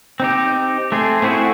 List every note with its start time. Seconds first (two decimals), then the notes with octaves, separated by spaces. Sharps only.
0.20 C4 D#4 G4
0.92 A3 C4 G#4
1.22 A3 C4 E4 F#4 G#4